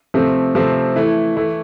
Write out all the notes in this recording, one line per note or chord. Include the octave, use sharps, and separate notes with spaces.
C3 F3 A3 C4
C3 F3 A3 C4
E3 A3 E4
E3 A3 E4